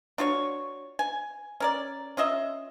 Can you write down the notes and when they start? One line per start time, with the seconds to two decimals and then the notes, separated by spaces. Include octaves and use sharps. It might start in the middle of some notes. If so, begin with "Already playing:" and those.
0.18 D4 F4 F#4 C#5
0.99 G#5
1.60 C#4 A#4 D5
2.17 C#4 F4 D#5 E5